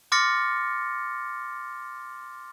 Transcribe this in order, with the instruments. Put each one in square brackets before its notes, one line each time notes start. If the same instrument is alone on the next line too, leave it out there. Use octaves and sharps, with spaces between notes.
[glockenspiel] C6 D6 F6 A6 A#6 C#7